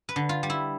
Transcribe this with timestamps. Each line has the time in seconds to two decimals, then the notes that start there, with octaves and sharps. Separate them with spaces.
0.09 B4
0.16 D3
0.29 F4
0.43 G3
0.50 E4